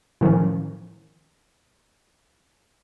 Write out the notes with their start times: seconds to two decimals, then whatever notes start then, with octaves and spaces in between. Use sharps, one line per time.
0.21 A2 D#3 F3 C#4